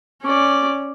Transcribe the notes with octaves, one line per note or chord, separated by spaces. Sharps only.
C#4 D5